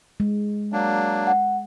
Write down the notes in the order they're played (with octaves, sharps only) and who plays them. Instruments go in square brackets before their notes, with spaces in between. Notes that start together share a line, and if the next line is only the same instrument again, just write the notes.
[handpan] G#3
[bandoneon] F#3 A#3 D4
[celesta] F#5